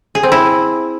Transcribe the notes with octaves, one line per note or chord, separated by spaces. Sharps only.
G#4
C4
E4